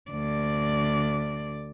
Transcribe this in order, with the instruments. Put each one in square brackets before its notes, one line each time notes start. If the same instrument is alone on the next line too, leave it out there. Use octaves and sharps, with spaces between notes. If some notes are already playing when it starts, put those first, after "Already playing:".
[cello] D2 D5